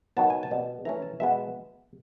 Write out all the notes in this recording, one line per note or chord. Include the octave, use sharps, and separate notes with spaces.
D#3 F#3 B3 A5
G#5
A5
B2 G3 C4
E3 A3 C#4 A#5
A5
B2 G#3 B3 E5